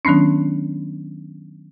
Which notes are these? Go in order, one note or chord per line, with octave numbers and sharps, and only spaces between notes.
D#3 F#3 B3 C#4 D4